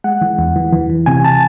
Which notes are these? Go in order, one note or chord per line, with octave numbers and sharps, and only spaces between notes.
G#3 F#5
E3
E2
E3
E3
E3
C3 G#5
A5